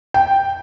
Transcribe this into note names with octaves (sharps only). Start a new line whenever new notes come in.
G5